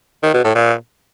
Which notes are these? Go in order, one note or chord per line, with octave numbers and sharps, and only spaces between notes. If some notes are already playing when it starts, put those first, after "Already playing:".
D#3
B2
A2
A#2